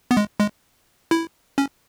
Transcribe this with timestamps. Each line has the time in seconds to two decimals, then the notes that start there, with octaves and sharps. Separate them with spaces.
0.11 B3
0.17 G#3
0.40 G#3
1.11 E4
1.58 C#4